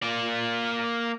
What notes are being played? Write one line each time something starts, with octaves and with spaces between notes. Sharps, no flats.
A#3 D5